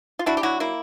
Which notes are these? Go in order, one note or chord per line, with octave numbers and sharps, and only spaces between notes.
F4
D4 E4 F#4
G4
F#3 E4 F#4
A#3 E4